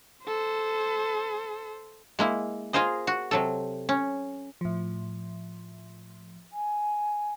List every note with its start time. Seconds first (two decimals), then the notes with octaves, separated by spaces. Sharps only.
0.25 A4 C5
2.19 G#3 A#3 E4
2.73 F4 G#4 A#4 C5 D#5
3.07 F#4
3.31 C3 F#3 A4
3.89 C#4
4.61 A2 F3
6.53 G#5